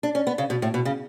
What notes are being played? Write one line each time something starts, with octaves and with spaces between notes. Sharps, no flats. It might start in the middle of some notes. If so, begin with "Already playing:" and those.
D4
C#4
B3
C#3
B2
A2
B2
C#3